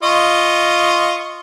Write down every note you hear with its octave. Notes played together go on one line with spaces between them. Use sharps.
F4 D#5 C#6